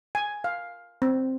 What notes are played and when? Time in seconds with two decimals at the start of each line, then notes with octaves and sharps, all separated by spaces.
0.15 G#5
0.44 F5
1.02 C4